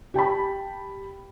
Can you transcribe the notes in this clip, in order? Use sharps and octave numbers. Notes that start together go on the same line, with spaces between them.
G4 G5 A5 B5